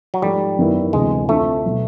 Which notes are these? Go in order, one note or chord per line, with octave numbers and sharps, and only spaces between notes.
F#3
G#2 F3 G3 A3
F#2 D#3 F#3 B3 E4
D2 C3 E3 G#3
F2 D3 F3 A3
B2 F#3 B3